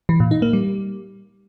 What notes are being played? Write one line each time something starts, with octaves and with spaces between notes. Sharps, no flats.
E3
A#2
D#4
A#3
G3